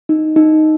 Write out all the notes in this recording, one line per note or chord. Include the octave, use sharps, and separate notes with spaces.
D#4
D#4